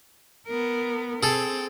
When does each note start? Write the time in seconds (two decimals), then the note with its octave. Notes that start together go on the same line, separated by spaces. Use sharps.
0.47 B3 A#4
1.23 C4 G#4 A4